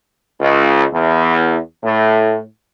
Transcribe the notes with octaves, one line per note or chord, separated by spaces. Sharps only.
C#2
E2
A2